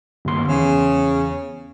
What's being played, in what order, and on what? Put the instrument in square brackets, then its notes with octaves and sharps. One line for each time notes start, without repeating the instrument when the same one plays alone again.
[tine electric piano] G1 D#2 C6
[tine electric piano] E2 [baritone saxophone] C#3